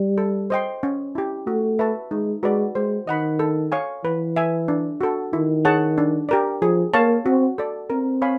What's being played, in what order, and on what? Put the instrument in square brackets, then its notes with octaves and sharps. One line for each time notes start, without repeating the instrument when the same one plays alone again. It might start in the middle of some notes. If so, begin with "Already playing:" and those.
Already playing: [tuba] G3
[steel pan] A4
C5 D#5 G5 C6
C#4
E4 G4
[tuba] A3 [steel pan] F#4
[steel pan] B4 E5 A5 C#6
[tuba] G#3 [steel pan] D#4
[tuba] G#3 [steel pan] F#4 B4 D5
[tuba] G#3 [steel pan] C5
[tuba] D#3 [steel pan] D#5 F#5 B5
[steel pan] A4
C#5 F5 G#5 C#6
[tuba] E3 [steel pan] B4
[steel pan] E5 G#5
D4
F#4 A4
[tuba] D#3 [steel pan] E4
[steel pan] G#4 C#5 F#5 A5
D4
G4 A#4 D5
[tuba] F3 [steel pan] G#4
[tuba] A#3 [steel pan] C#5 F5 A5 C#6
[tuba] C4 [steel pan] F#4
[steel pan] A4 D5
[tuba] C4 [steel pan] A#4
[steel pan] C#5 F5 G#5 B5